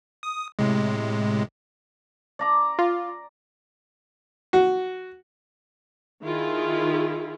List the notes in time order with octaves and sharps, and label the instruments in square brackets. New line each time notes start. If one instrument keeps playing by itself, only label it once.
[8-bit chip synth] D#6
A2 C3 G#3
[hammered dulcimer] D5 A#5 D6
[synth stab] F4
[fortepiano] F#4
[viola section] D#3 E4 F4 G#4